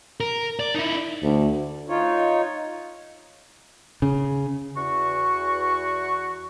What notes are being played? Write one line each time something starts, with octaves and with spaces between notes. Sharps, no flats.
A#4
D5
D#4 E4
D2
D#4 F4 C#5
C#3
E2 F#4 C#6